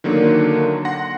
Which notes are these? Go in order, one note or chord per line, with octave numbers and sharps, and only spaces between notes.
D3 D#3 F#3 A#3 D4
F#5 C6 A#6